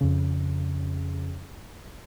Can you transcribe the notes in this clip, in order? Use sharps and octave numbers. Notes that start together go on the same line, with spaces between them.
F2 C#3